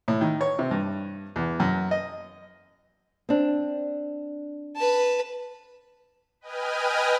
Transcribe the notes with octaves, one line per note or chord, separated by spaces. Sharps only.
A2
D#3
C#5
C3
G2
E2
F#2
D#5
C4 D4
B4 A5
B4 D#5 G5 G#5 D#6 F6